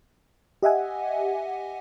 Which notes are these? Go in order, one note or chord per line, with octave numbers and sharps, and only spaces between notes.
G4 D#5 E5 F#5 G#5